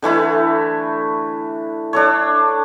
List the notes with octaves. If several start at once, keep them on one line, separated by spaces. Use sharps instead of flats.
D3 E3 A3 E4
D4 A4 C#5